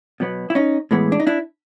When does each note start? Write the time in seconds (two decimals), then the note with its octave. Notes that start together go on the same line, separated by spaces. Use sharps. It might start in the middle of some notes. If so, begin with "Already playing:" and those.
0.20 B2 F#3 B3
0.50 E4
0.55 C#4 D#4
0.91 A2 E3 G#3 B3
1.12 D4
1.20 D#4
1.27 D4 E4